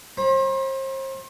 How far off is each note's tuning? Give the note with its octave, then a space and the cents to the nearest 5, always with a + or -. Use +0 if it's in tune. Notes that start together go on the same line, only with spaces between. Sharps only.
C5 +35 B5 -40